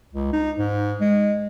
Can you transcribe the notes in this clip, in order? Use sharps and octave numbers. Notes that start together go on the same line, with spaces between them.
C#2
D#4
G#2
G#3